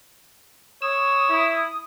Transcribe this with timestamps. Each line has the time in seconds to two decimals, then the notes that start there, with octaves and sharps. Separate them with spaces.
0.82 C#5 D#6 E6
1.29 E4